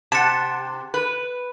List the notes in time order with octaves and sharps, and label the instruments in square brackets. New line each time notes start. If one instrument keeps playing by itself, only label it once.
[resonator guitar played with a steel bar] C3 [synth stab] F#5 A5
[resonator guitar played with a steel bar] B4